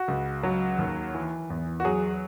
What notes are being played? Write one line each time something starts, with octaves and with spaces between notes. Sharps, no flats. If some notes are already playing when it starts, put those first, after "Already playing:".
Already playing: F#4
C#2
F#3
D#2
E3
E2
F#4
F#3 G#4